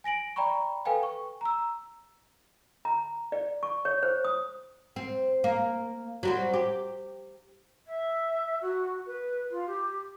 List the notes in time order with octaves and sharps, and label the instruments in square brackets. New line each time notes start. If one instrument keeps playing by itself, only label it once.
[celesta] G#5 A#6 D7 F#7
D5 G5 A#5 B5 C#6
A4 B4 F5 G5 G#5
C#6
A#5 E6
[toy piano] A#5
D5
C#6
C#5
C5
D#6
[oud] C4
A#3
F#3 G3 C4
G4
[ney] E5
F#4
B4
F4
G4